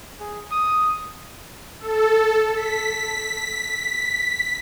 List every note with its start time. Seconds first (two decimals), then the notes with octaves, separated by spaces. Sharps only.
0.20 G#4
0.52 D#6
1.80 A4
2.55 B6